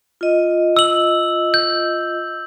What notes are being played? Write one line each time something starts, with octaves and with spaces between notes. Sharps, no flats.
F4 D#5
E6 F#7
G6